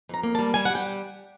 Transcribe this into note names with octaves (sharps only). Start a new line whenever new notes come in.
F2 A#5
A#3
A5
G3
G3 G#5
F#5
G3 G5